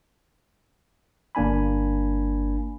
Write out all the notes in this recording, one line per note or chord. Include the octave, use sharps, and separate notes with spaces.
G1 A#3 D4 G#5 B5